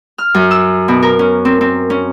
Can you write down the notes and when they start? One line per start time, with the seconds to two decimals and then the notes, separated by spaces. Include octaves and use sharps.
0.18 F6
0.34 F#2
0.51 E6
0.88 B2
1.02 A#4
1.19 C#4
1.45 C4
1.61 C4
1.90 C#4